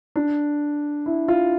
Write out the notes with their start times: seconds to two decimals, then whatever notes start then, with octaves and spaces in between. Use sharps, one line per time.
0.16 D4
1.06 E4
1.28 F4